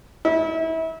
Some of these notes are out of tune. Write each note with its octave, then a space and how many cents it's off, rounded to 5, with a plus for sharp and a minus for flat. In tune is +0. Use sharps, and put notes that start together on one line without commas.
E4 -30